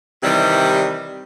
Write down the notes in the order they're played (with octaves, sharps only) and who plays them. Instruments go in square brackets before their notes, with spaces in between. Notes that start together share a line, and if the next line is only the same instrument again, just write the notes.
[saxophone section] C3 D#3 E3 G3